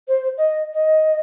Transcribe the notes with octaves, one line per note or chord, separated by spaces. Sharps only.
C5
D#5
D#5